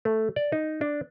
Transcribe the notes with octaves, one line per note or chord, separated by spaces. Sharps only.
A3
D5
D#4
D4